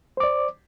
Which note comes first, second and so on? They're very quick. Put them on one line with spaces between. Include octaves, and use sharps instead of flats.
C5 D6 D5